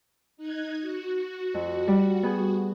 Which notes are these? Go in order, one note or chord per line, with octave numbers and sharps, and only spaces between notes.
D#4 F#6 G#6
F#4
F2
G3
B3 G#4